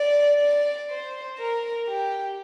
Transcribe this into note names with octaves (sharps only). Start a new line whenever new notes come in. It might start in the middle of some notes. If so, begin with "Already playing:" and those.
Already playing: D5
D5
C5
A#4
G4